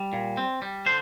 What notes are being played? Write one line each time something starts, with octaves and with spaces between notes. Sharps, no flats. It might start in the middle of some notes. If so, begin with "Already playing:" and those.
Already playing: G3
A#2
C4
G3
D3 C5